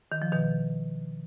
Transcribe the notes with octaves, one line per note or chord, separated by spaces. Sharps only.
D#3
F3
B2 D#3